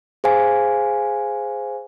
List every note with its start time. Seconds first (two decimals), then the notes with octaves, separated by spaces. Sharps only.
0.24 G#4 C5 F5 G#5